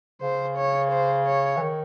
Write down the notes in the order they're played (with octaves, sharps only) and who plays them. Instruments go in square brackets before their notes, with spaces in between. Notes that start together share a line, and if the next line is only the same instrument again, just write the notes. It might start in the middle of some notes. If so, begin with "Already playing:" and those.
[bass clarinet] C#3 [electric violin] C5
[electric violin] C#5
C5
C#5
[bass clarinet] E3
D#3